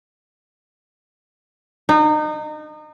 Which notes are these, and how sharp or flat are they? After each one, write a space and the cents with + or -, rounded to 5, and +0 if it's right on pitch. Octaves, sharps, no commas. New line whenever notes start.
D#4 -30